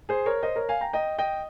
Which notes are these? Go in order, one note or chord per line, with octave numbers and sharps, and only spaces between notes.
G#4 C5
A#4 C#5
C5 D#5
A#4 C#5
F5 G#5
G5 A#5
D#5 G5
D#5 G5